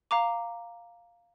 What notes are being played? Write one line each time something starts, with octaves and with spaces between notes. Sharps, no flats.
F5 A#5 D6